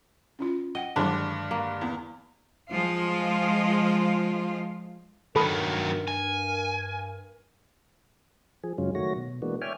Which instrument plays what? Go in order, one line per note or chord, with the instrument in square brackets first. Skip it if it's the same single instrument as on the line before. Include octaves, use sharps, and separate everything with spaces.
[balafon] C#4 E4 F4
[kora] D#5 [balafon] F#5 G5
[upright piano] G2 D3 G#3 [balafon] D#3 F#3 E4 [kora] D4
[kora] A#3
[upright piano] E2
[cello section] F3 G#3 F4
[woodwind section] G2 A#4 [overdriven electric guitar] D#3 F#3 [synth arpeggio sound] A4 B5 D#6
[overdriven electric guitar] G#5
[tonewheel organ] F3 G#4
F#2 C#3 F#3 G#3 C#4 F4
D#3 F#3 A3 F#4 C#5 A#6
B2
E3 G#3 A#3 B3 D4 F#4
C#5 D5 E5 G5 G#5 F6